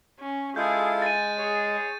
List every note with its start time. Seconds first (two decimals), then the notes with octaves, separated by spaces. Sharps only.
0.20 C#4
0.56 G#3 E4 F4 G#4 A4 G6
1.02 G#5 A6 D#7
1.38 G#4 C#5